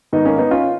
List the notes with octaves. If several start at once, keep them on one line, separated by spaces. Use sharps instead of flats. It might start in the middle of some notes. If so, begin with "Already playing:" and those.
G#2 D#3 B3 D#4
A#3 C#4
B3 D#4
C#4 F4